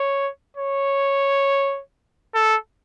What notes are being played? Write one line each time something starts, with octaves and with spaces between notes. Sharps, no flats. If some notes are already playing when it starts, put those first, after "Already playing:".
Already playing: C#5
C#5
A4